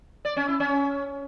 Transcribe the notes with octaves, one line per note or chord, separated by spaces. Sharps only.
D5
C#4
E4
C#4